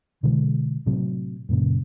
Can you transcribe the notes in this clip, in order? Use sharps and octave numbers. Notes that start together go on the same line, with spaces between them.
B2 D3 E3 G#3
A2 C3 F#3
F#2 A#2 C#3